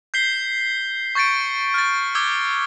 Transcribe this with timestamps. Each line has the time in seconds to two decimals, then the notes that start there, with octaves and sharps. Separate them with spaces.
0.14 G6 B6 C7 G7
1.15 C#6 G6 A6 C#7 D7
1.74 F6 A6
2.15 D6 E6 G6 G#6 G7